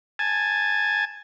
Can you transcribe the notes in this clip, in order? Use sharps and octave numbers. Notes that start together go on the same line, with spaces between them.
G#5 A5